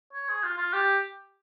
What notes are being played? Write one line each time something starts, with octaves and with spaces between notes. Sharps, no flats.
C#5
G#4
F4
F4
G4